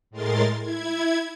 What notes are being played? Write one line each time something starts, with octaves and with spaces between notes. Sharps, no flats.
A2 G#3 A#4 C6 A6
E4 G#6